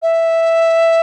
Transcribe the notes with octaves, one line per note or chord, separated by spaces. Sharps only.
E5